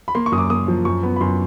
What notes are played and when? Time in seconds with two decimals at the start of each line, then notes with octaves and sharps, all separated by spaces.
0.08 B5
0.15 A#3 C6
0.26 C#6
0.32 F#2 D#6
0.38 D6
0.50 A#3 D#6
0.68 F3
0.85 F#2 C#6
1.03 B3
1.16 B5
1.21 F#2 C6